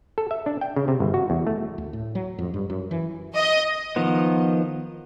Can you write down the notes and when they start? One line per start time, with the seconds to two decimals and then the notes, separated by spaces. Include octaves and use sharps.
0.18 A4
0.31 E5
0.46 D4
0.61 G5
0.76 C#3
0.88 C3
1.00 G1
1.14 F#4
1.30 E2
1.47 A3
1.78 D2
1.93 A2
2.15 F#3
2.38 F2
2.54 G2
2.70 F#2
2.91 E3
3.36 D#5
3.96 D#3 F3 B3